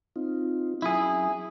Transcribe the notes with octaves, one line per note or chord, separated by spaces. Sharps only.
C4 D#4 F4
F#3 C#4 E4 G#4